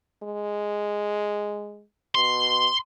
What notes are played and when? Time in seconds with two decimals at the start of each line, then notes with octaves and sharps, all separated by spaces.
0.23 G#3
2.15 B2 C6